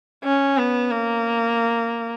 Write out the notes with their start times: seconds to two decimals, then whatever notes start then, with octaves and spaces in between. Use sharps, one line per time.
0.24 C#4
0.58 B3
0.91 A#3